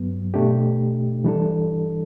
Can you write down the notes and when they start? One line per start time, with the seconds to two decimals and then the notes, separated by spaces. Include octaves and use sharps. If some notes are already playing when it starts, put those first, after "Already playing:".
Already playing: G2 F#3 B3
0.34 B2 A3 D4 G4
1.24 E3 G3 D4 A4